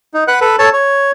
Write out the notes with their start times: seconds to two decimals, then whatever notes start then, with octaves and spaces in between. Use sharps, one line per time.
0.14 D#4
0.28 B4 F#5 F#6
0.41 A4 B4
0.59 A4 C#5 A5
0.73 C#5